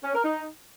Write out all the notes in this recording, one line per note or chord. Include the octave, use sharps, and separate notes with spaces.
C#4
A#4
D#4